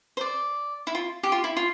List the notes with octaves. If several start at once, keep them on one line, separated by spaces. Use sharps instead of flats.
C5
D5
E4
F4
G4
F4
E4
F4